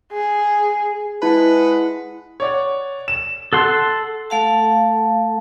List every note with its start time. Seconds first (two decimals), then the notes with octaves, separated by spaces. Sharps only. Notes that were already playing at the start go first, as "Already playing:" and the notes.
0.13 G#4
1.22 G#3 E4 B4 F#5 A5
2.40 C#5 D5 F#5
3.08 E7
3.53 A4 F#5 C6
4.30 A3 A4 F5 F#5 A5